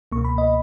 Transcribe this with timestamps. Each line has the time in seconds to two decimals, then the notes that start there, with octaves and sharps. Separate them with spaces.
0.12 C#2 B2 A#3 C#6
0.25 B5
0.38 D#5